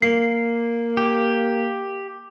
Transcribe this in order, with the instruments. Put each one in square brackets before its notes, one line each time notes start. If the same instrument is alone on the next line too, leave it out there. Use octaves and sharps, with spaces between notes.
[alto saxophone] A#3 [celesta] C7
[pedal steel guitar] G4